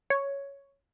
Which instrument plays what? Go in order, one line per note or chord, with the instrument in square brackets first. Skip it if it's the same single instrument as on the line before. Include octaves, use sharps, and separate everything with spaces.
[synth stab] C#5